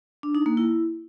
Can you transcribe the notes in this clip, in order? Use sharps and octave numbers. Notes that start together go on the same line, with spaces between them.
D4
D#4
A#3
E4